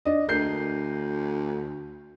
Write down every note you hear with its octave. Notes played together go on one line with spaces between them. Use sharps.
D4 D#5
D2 A#4 G6 C7